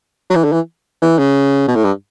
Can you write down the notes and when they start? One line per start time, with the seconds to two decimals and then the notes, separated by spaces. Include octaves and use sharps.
0.30 F#3
0.35 E3
0.44 D3
0.52 E3
1.02 E3
1.19 C#3
1.67 B2
1.76 A2
1.84 G2